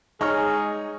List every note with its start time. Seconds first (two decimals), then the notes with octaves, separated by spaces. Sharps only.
0.21 G#3 D#4 G#4 C#5 A#5 F6